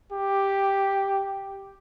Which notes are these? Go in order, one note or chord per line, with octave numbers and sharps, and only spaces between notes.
G4